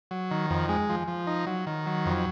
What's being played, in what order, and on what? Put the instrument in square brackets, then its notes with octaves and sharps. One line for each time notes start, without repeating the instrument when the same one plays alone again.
[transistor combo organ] F#3
D#3
F2
G#3
F3
F3
D#4
F#3
D#3
F#3
F2